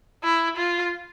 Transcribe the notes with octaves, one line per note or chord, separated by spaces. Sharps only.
E4
F4